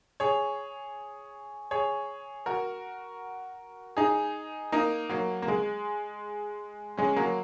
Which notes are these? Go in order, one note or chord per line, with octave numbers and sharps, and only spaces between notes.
G#4 C#5
G#4 C#5
F#4 A#4
D#4 G#4
A#3 D#4
F#3 A#3
A#3
G#3
G#3 C#4
F#3 A#3